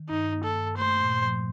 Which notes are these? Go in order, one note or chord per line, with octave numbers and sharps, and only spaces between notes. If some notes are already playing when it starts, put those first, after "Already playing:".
Already playing: D#3
G2 D#4
A#3
A4
G2
A3 C5
A#2
F3